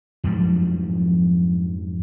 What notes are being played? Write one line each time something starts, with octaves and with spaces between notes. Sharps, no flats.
F2 G#2 F3 F#3